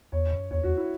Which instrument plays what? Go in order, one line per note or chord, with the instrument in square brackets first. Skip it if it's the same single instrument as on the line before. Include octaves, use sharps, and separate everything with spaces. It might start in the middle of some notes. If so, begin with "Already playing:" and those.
[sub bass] E2 [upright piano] C#5
[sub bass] F#2
[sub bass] E2 [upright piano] C#5
[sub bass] E2 [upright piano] F#4
[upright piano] E4